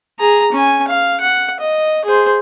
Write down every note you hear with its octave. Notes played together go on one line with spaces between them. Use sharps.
G#4 A#5
C#4 G#5
F5
F#5
D#5
G#4 C5